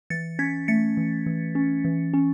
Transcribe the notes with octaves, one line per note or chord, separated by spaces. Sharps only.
E3 A6 C#7
C#4 G#6 B6
A3 A6 C#7
E3
E3
C#4
E3
C#4